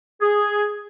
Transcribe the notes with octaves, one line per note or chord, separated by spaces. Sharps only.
G#4